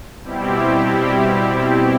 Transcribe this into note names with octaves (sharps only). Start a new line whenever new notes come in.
B2 G3 C4 E4 G4